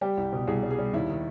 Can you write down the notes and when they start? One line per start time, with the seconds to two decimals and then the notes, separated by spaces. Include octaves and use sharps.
0.01 G3 G4
0.17 C2
0.33 B2
0.47 C2 G#4
0.63 G3
0.71 G#4
0.79 G3
0.93 D#2 E4
1.10 D#3